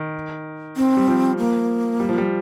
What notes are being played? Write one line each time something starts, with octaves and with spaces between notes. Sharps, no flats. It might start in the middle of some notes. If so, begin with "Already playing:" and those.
Already playing: D#3
C4
G3
F3
A#3
G3
F3
G3